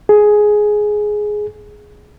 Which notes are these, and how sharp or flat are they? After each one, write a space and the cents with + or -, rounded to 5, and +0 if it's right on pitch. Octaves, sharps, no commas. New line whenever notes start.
G#4 +10